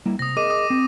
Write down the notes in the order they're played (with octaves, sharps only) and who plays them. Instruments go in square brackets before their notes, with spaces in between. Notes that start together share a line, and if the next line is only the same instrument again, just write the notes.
[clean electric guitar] G3 A#3 E4
[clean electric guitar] C3 [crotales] D#6 A#6
[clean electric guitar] G#4 A#4 D#5 [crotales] D6 D#7
[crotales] D6 D#6
[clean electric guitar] C4